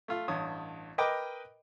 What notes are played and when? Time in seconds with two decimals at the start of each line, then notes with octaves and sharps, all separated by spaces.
0.08 A3 F4
0.28 A1 G2 C#5 D#6
0.98 A#4 B4 D#5 G5 D6